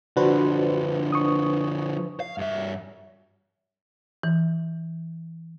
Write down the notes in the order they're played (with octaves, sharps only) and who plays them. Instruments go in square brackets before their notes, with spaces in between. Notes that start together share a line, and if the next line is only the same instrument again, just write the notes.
[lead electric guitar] D3 F3 [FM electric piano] D4 B4 C5 [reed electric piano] F#4
[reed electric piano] C#6 D#6
[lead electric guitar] F5
G2 E5
[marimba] E3